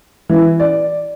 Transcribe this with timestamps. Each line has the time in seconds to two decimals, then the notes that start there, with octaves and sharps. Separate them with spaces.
0.29 E3
0.60 D5